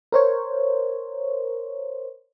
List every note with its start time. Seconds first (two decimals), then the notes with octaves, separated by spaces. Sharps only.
0.12 A#4 C5 C#5